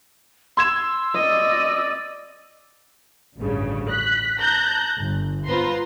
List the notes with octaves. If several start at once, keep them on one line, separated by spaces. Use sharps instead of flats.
C6 E6 G#6 E7
D5 D#5
A1 D2 G2 C#3
F#6 B6
A5 A#5 F#6 G6 A#6
G1
B3 F4 B4 C5 A#5 C6